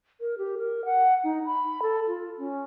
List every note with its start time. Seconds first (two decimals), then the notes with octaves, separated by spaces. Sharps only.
0.21 A#4
0.38 G4
0.58 A#4
0.85 F#5
1.24 D#4
1.45 B5
1.82 A4
2.08 F4
2.38 C#4